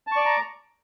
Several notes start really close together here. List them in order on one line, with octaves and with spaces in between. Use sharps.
A5 C#6 D5 D6 A#5